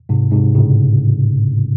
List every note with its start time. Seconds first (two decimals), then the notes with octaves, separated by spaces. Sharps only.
0.09 G#2 C3
0.32 G#2 C3
0.55 A2 C#3